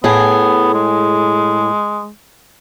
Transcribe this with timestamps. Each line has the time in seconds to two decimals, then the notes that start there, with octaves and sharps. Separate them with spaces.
0.04 A2 B3 G#4
0.74 G#3